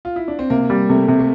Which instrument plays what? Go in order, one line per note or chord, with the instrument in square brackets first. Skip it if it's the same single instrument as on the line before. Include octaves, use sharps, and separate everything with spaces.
[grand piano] F4
E4
D4
C4
[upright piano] C3 [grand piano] A#3
[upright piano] G3
[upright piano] C3 [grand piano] A3
[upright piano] C3
[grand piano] A3